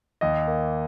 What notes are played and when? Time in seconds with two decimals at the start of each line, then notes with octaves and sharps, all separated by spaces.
0.21 D#2 D#5
0.47 A#3